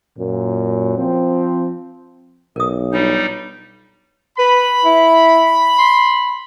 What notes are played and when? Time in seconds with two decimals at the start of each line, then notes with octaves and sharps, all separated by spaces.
0.18 F#2 A#2
0.97 F3 C4
2.56 B1 A#4 D#6
2.93 G3 D4 D#4 F4 C#5
4.39 B4 B5
4.85 E4
5.79 C6